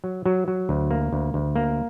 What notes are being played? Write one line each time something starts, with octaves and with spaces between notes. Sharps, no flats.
F#3
F#3
F#3
D2
A#3
D2
D2
A#3